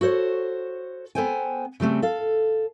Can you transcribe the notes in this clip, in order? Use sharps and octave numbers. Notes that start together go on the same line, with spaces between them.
F#4 A4 C5 C#5
B3 A4 C5 G5 G#5
C#3 G3 A3 C4
A4 F5